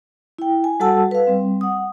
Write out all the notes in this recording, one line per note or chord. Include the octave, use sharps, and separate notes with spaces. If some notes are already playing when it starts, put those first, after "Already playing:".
E4 G5
G#5
G3 F#4 A4 F#5 A5 E6
B4 F5
G3 C4
F#5 D#6